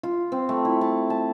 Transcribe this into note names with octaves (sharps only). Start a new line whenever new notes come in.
F4
C4
A3
E4
A5
A5